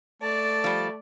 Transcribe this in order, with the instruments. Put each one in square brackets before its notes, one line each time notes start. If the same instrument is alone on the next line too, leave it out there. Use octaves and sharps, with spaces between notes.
[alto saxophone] A3 [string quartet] D5 [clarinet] A5
[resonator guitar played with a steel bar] F3 G3